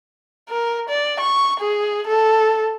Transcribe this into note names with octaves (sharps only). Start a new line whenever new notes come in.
A#4
D5
C#6
G#4
A4